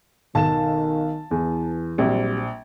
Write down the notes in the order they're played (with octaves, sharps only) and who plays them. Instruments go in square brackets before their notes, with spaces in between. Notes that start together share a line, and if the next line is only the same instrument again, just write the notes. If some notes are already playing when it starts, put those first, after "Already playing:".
[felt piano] B1 E7 [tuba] D#3 [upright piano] A5
[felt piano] E2 [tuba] E3
[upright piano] A#1 [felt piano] F#3 G3 C4